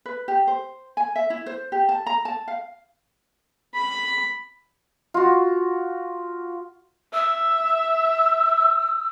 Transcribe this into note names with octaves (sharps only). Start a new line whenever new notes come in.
B4
G4
C5
G#5
E5
E4
C5
G4
A5
A#5
A5
F5
B5
F4 F#4
E5 E6